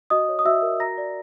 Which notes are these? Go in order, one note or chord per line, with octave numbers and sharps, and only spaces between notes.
F#4 D#5 D#6
C#5
D#6
F#4 E5 E6
A#4
F#4 A#5 A#6
D5